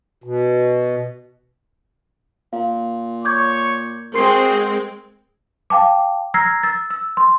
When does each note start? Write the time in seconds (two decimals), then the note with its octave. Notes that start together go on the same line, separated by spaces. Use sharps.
0.24 B2
2.53 A#2 F5
3.25 C#5 C#6 D6 G6 G#6
4.14 G#3 C4 F#4 G#4 A#4 C5 C6 C7
5.70 F5 G5 A5 D6
6.34 A#5 E6 F6 G#6 A#6 C7
6.63 E6 A6
6.90 E6
7.17 C6